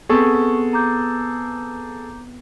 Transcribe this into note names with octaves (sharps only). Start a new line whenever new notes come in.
B3 C4 G#4 A4 B4 C#6
A#5 D6 G6